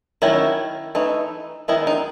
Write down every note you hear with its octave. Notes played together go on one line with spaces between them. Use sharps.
D#3 F#3 A3 C#4 E4
E3 A3 D#4
D#3 G#3 B3 D#4 E4
D#4